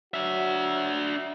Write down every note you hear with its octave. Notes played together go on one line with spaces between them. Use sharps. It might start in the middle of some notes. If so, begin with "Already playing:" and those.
F#3 D4 F#4 E5